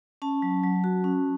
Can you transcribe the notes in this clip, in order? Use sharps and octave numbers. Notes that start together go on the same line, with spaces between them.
C#4 A5
F#3
F#3
F#4
C#4